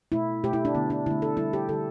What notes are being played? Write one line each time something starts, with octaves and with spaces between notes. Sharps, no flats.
B2 A3 E4
B2 A3 G4
E4
D4
D3 A3 B3
D4
D3 A3 E4
A4
D3 G3 E4
G4
D3 G3 A4